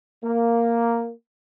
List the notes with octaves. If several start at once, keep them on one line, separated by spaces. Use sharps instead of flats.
A#3